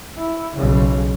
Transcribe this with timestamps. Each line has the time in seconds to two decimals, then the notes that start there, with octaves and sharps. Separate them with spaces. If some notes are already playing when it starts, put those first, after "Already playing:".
0.18 E4
0.57 B1 C#3